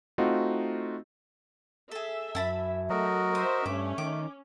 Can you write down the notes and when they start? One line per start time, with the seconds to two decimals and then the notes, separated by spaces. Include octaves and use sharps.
0.18 A3 C4 D#4 F4 F#4 D#5
1.91 G#4 A4 E5
2.35 F#2 E4 A5 B5
2.90 F#3 A3 F#4 A#4 D#5
3.35 C5 E5 D#6
3.66 G2 A3 C#4 D6
3.98 D#3 D6